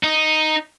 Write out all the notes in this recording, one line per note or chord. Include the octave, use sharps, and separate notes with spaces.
D#4